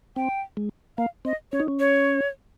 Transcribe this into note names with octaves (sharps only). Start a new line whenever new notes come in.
C4 G5
G#3
A#3 F5
C4 D#5
C#4 C#5
D#4
C#4
C#5